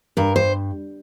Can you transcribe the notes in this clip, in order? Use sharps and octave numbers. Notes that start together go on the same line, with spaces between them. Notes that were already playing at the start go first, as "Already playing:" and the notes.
G2 A#4
C5